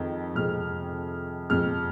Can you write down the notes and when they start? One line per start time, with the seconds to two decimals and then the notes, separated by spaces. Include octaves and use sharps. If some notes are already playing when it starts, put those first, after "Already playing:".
Already playing: F2 D#3 G#3
0.36 F2 C3 G#3 F6
1.50 F2 C3 G#3 F6